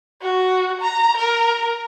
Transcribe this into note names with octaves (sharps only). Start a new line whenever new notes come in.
F#4
A#5
A#4